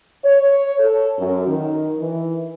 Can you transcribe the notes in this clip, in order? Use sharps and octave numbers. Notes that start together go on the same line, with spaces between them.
C#5
A4
F#2
D#3
E3